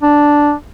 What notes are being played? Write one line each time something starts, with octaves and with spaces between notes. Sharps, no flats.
D4